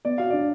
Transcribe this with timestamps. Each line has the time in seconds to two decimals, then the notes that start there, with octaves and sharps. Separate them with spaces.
0.05 B3 D5
0.18 F#4 F5
0.30 D4 D5